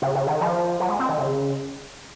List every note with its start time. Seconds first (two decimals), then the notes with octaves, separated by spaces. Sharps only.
0.02 C#3
0.15 C#3
0.27 D#3
0.41 F3
0.80 F#3
0.89 G#3
0.99 C4
1.09 D#3
1.18 C#3